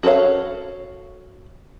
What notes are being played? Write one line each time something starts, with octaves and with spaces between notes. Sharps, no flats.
F#4 A4 A#4 C#5 F5